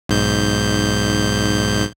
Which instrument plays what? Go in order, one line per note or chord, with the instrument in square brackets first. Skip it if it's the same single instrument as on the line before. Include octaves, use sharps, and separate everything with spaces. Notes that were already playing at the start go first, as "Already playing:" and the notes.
[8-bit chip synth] B1 G#2 G6